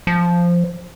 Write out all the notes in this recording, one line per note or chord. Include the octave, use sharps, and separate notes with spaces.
F3